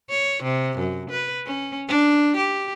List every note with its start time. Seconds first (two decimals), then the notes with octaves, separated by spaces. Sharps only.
0.10 C#5
0.43 C3
0.79 F#2
1.10 B4
1.46 C#4
1.89 D4
2.37 G4